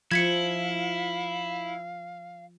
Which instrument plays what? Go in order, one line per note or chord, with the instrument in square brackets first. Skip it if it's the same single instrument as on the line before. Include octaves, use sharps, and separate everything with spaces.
[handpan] F3 [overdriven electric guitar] E4 [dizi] F5 [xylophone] G#6 B6 C#7